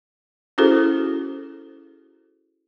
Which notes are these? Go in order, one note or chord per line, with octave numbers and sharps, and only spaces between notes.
C#4 E4 F#4 G#4 A4 C5